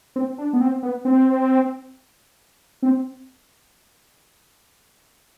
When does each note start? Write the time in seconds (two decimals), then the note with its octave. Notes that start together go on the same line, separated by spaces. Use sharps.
0.16 C4
0.38 D4
0.53 B3
0.61 C4
0.83 B3
1.05 C4
2.83 C4